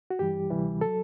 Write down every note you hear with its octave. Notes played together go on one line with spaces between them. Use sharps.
F#4
G2 E3 G3 G4
D2 C3 E3 G3
F#3 A4